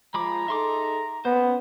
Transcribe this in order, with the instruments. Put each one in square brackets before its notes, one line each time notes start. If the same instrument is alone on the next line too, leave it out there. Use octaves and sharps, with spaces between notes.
[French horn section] F3 [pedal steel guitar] G#3 B5 D6 [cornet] A#5
[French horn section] D#4 G#4 A4 [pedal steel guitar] E5 C6 D6
[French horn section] A#3 C#4 [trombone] B3 [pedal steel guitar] C5